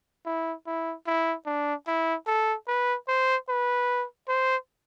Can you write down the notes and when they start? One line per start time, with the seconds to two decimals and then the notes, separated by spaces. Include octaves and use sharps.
0.26 E4
0.67 E4
1.07 E4
1.46 D4
1.87 E4
2.27 A4
2.67 B4
3.08 C5
3.49 B4
4.28 C5